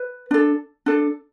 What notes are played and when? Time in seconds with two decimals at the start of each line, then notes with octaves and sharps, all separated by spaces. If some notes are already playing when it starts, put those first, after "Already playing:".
Already playing: B4
0.31 D4 A4
0.86 D4 A4